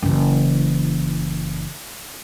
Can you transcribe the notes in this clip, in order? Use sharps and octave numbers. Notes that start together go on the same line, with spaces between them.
F#1 E3